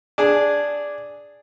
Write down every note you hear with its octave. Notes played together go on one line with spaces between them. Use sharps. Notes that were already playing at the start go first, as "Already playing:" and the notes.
D4 G#4